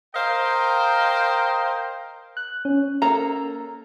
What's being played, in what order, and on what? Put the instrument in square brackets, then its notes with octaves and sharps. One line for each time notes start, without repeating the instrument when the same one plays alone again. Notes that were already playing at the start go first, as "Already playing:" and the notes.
[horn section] A#4 C5 D#5 F5 G5
[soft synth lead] F#6
C#4
[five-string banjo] A#3 A4 A#5